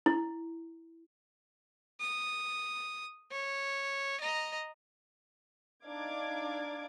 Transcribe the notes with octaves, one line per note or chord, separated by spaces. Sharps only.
E4
D#6
C#5
D#5 A#5
D4 D#4 D5 F5 D6 G#6